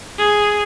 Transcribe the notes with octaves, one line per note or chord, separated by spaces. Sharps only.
G#4